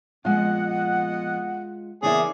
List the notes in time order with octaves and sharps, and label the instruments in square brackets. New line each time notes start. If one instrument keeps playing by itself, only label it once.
[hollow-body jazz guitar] F2 A#2 [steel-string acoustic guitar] G#3 F4 [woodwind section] B3 D#5 F#5
[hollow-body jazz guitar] C#3 E3 A#3 [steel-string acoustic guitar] B3 E5 [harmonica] G#4 [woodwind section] C#5 D5